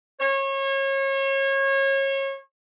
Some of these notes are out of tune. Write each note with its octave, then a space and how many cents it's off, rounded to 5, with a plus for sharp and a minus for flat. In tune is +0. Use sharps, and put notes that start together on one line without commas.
C#5 -30